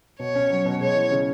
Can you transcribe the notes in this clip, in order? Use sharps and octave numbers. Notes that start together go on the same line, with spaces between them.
B2 C#5
C#4
F#3
B2
G#3 C#5
E3
C#3